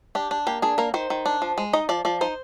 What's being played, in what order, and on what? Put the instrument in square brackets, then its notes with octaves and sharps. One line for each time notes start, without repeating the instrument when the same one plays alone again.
[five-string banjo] D4 G4
D4
A#3 G4
D4 G#4
A#3 A#4
D#3 C5
D#3
D4
F3
G#3
D#4 D#5
F3 D5
F3 D5
D#4 C5